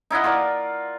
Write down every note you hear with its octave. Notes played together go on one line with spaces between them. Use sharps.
D#4 E4 D#5 F#5
F4 A#4 D5